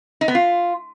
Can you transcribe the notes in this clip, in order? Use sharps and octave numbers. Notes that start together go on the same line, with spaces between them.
D#4
B3
F4